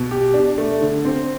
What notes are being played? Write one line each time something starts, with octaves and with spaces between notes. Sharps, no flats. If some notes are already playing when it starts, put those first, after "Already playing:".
Already playing: B2
G4
D4
A3
D3
C4